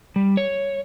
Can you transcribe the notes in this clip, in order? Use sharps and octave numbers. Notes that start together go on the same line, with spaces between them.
G3
C#5